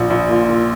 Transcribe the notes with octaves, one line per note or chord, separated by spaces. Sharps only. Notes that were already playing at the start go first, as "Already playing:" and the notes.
Already playing: A#1
A#1
A#2
A#2